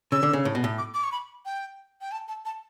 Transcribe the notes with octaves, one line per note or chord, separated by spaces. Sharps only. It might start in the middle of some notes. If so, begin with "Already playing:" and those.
C#3 E6
D3
C#3
A2
B2
A2
D6
D6
C#6
B5
G5
G5
A5
A5
A5